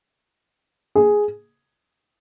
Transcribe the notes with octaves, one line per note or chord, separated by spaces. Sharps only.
G#4